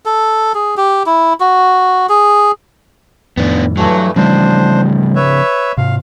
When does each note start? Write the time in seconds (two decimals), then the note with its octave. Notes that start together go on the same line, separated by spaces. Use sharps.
0.05 A4
0.55 G#4
0.77 G4
1.06 E4
1.40 F#4
2.09 G#4
3.37 F2 A2 D#3 B3 D4
3.77 G2 E3 F#3 A3
4.16 C#3 E3 F3 G3 A3 D4 C5
5.15 B4 C#5 E5
5.78 G#2 C3 F5